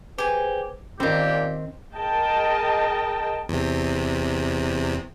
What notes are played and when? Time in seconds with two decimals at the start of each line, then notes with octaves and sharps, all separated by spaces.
0.18 G4 G#4 B4 C5 G#5
1.00 A#2 D#3 C4 C#4 G4
1.96 G#4 A#4 D#5 G5 A5
3.49 E2 C3